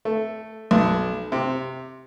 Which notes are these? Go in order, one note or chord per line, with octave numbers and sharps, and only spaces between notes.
A3
B1
C3